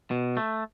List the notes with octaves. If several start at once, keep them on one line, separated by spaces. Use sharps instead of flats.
B2
A3